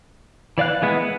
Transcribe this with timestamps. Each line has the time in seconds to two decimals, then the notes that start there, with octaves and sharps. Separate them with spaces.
0.58 E3 D5 F5 F#6
0.82 E3 G#3 B3
1.03 B4